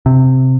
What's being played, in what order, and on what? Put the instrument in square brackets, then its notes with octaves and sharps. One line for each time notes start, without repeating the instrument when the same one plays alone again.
[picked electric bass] C3